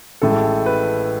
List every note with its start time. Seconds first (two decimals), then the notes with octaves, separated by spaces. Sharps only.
0.22 A1 A2 G#3 A4
0.66 B4